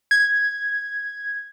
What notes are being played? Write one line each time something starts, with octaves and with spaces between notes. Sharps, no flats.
G#6